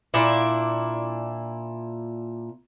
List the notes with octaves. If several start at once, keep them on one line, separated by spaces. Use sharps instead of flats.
A#2 D4 E4